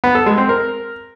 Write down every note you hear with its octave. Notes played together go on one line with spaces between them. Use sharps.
B3
A4
G#3
C4
A#4